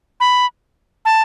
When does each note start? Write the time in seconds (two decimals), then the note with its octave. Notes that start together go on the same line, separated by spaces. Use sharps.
0.20 B5
1.05 A5